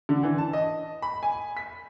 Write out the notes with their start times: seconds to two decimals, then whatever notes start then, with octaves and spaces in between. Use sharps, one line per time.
0.09 D3
0.23 E3
0.38 A5
0.53 D#5
1.02 B5
1.23 G#5
1.57 B6